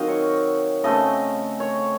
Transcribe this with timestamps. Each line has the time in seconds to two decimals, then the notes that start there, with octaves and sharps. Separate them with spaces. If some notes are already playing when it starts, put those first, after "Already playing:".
Already playing: D#3 F#3 C4 D#5 F5
0.08 C#5
0.84 C#3 A3 C4 D#5
1.60 C#5